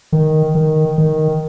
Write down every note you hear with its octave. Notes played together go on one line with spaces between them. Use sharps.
D#3
D#3
D#3